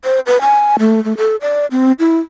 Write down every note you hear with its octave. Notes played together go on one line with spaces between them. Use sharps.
C5
B4
G#5
A3
A3
A4
D5
C4
E4